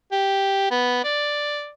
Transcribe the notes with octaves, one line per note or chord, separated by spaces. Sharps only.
G4
B3
D5